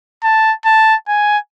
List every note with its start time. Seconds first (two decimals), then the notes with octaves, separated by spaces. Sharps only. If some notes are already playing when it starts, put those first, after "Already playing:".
0.23 A5
0.65 A5
1.08 G#5